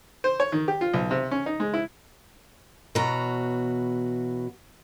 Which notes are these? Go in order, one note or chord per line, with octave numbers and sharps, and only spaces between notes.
C5
C#5
D#3
G4
F4
B1
C3
C#4
D#4
G#3
E4
B2 E3 F#4 C#5 A#5